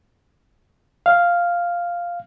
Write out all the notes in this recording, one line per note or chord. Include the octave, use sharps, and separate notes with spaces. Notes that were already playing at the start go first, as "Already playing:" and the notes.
F5